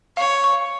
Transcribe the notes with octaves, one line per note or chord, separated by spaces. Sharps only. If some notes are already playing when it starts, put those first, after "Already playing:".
C#5 F5
C#6